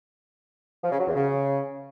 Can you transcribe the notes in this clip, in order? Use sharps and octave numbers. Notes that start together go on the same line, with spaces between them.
F3
C#3
F#3
E2
C#3